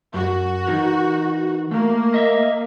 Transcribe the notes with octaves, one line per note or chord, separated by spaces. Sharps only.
F#2 F#4
E3 D#4 A#4
A3 A#3
D#5 E5